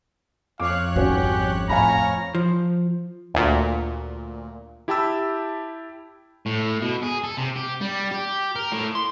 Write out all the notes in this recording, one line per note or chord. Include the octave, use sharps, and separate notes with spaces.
F2 C#5 F5 D6 F#6
G#1 G3 C#4 F#4 G4
F2 A2 C#5 F5 G#5 A#5 B5 F6
F3
D2 A#2
E4 G4 G5 A5 B5 E6
A2
B2
G#4
A4
C3
G4
G3
G4
A#4
A2
C6